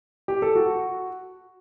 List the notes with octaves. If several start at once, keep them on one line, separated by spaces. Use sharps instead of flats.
G4
A4
F#4